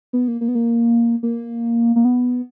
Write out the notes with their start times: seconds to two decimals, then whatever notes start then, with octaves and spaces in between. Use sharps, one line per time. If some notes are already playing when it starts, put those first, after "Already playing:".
0.13 B3
0.28 A#3
0.41 A#3
0.48 B3
0.55 A#3
1.23 A#3
1.96 A#3
2.05 B3